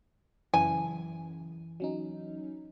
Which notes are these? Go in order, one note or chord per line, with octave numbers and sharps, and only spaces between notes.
F#2 C#3 E3 G#5
F#3 C#4 D#4